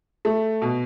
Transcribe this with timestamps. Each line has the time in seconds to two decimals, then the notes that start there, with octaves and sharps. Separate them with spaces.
0.25 A3
0.62 B2